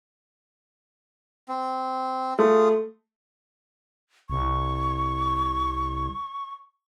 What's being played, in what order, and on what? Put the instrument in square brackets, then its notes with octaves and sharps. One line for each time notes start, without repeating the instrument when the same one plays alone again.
[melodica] C4
[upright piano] A3 [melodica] F4 G#4
[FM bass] C2 [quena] C#6